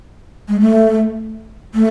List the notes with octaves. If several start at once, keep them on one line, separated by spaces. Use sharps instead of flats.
G#3
A3
A3